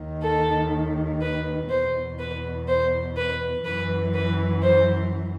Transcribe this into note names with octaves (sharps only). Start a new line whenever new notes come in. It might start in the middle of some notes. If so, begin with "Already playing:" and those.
Already playing: D#2 D#3
A4
B4
E2 B2 C5
B4
C5
B4
F#2 E3 B4
B4
C5